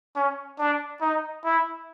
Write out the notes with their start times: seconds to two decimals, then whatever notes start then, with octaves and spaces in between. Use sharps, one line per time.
0.16 C#4
0.59 D4
1.01 D#4
1.44 E4